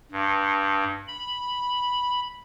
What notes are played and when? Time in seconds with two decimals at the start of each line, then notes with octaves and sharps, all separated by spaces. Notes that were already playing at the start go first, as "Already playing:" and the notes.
0.12 G2
1.08 B5